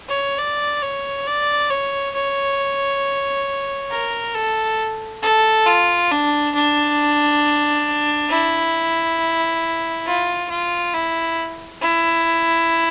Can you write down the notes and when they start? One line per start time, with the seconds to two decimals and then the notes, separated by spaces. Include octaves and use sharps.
0.09 C#5
0.39 D5
0.83 C#5
1.27 D5
1.70 C#5
2.15 C#5
3.91 A#4
4.34 A4
5.23 A4
5.66 F4
6.11 D4
6.55 D4
8.30 E4
10.07 F4
10.50 F4
10.94 E4
11.82 E4